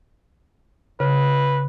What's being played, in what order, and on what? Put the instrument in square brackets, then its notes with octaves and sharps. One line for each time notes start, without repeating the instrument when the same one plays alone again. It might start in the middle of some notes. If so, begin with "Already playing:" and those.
[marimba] C#3 [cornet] B4